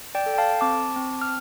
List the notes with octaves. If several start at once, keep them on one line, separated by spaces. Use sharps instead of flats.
D5 G5
A4
G5
F5 A5
C4 A5 D6
C4
F6